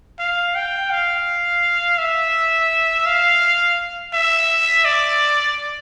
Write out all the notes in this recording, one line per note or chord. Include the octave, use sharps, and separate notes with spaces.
F5
G5
F5
E5
F5
E5
D5